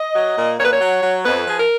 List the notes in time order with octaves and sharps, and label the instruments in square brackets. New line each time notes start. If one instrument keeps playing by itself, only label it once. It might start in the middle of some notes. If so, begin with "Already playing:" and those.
Already playing: [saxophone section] D#5
F#3
A#2
A#2 C#5
B4
C#5
F#3
F#3
F2 B4
F3 G#4
A#4